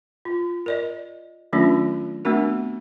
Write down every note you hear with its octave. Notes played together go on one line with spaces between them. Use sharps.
F4
A#4 D5 D#5
D#3 F#3 A3 C#4 D4 F4
A3 B3 C4 D4 F#4 A#4